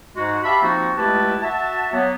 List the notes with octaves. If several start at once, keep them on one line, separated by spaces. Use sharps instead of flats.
G#2 G#3 F#4
G4 E5 F5 A5 B5
F3 A#3 C4 D#4 F4 F#4
C#2 A3 E4 G4 B4 A5
F#4 E5 A5
F#3 A#3 B3